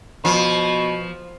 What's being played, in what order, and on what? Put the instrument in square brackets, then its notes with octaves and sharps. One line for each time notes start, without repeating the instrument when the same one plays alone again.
[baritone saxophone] B2 [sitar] F3